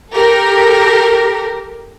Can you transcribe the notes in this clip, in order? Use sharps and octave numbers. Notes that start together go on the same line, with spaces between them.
G4 A4 A#4